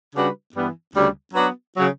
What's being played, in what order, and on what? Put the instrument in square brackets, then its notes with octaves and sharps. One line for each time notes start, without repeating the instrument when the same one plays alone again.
[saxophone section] C#3 G3 D4 F#4 B4
G2 E3 G3 B3
D2 C#3 G3
F#3 B3 D4 F#4 B4
C#3 F#3